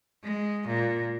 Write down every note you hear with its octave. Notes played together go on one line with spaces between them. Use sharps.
G#3
A#2